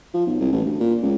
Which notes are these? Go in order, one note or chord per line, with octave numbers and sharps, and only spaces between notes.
F3
B1
C2
A1
D2
A#2
C#2